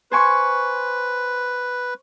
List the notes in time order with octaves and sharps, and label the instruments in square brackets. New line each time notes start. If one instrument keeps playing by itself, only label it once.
[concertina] B4 [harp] C5 G#5 C#6